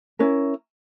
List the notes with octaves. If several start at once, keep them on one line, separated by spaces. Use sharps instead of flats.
C#4 E4 A#4